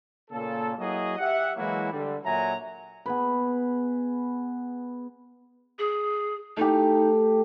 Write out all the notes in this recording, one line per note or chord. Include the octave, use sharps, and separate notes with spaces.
A#2 C#3 A#3 A4
F#3 A#3 E4 F#4 G#4 D#5
G4 E5 F#5
E3 F#3 G#3 A#3 E4 F#4
D3 G3
A#2 F#3 E5 G#5 A#5
B3 G#4 B4
G#4
A3 D#4 G4